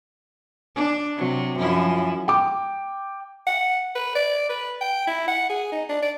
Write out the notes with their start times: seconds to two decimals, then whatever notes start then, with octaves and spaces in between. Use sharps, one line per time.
0.76 D4
1.17 C3 F#3
1.59 F#2 F3 E4
2.28 G5 D6
3.47 F#5
3.95 B4
4.15 D5
4.49 B4
4.81 G5
5.07 E4
5.28 F#5
5.49 G#4
5.72 D#4
5.89 D4
6.02 D5